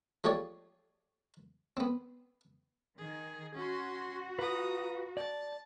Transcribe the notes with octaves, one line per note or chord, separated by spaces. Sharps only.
F3 A3 G4 G#4 C#5 D5
B3 C4
D#3 G#4
C#4 F#4 C6
F4 B4 A#5 D#6
D5 A5